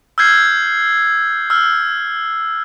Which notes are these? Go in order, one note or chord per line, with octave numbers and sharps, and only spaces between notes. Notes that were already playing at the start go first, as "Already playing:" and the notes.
E6 F6 G6 G#6 C7
E6 F6